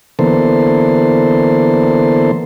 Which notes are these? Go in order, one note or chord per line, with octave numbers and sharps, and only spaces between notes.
D3 E3 A#3 B3 A4 C5